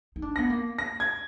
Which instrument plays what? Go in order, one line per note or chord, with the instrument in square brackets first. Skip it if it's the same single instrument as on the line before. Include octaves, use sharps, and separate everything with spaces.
[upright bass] D#4
D4
[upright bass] B3 [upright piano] A#6
[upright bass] A#3
[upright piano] A#6
G#6